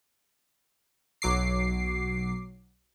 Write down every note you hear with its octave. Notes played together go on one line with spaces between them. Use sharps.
B1 F#3 D6 C7